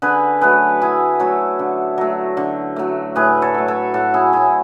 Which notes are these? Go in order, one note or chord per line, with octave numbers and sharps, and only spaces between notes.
D3 G#4 B4
F#3 A3 G#4 B4
D3 E4 G#4
F#3 A3 A4 C#5
D3
F#3 A3
D3
F#3 A3
A2 G#4 B4
A4 C#5
F#3 A3
A4 C#5
A2 F#4 A4
E4 G#4
F#3 A3 E4 G#4